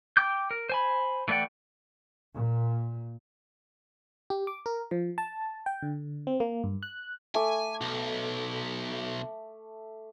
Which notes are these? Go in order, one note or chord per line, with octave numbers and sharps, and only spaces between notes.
G5 D6 G6
A#4
C5 G#5 B5
E3 A3 D5 F#5 G5
A#2
G4
D6
A#4
F3
A5
G5
D3
C4
A#3
G2
F#6
A3 G#5 D6
B1